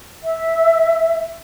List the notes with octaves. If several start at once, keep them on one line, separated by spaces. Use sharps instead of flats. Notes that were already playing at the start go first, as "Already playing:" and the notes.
E5